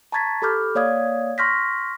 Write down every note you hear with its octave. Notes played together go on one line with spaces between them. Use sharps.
A5 A#5 C#6 G#6 A6 B6
G4 A4 B5 D6 F6 G6
A#3 C#5 D5 F5 D#6 G#6
C6 C#6 F6 G6 A#6 B6